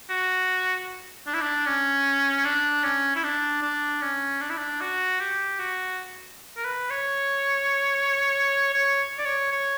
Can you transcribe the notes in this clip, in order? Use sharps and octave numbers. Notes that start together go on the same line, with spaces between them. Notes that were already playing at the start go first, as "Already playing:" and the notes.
F#4
D4
E4
D4
C#4
D4
C#4
E4
D4
D4
C#4
D4
E4
D4
F#4
G4
F#4
A#4
B4
C#5
C#5
D5
C#5
C#5